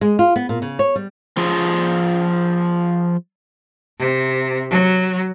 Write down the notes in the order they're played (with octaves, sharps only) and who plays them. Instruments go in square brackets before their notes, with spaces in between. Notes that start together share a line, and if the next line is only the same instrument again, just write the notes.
[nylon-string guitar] G#3
F4
B3
A#2
C#3
C#5
G3
[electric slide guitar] F3 F4 G#4
[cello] C3
F#3